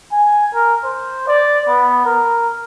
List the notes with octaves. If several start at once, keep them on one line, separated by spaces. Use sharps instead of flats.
G#5
A#4
C5
D5
B3
A#4